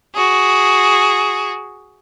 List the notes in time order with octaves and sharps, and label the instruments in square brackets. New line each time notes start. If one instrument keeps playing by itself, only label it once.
[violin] F#4 G#4